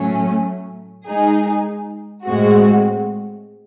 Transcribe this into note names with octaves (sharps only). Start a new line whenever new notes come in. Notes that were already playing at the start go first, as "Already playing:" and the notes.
Already playing: A2 F#3 A3 C#4
G#3 D#4 G#4
A2 G#3 C4 F#4